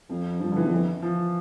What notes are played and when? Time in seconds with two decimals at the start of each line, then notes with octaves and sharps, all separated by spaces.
0.09 F2 F3
0.41 G2 F3
0.52 D3
0.56 E3
0.64 E2
0.71 F2 E3
1.02 F3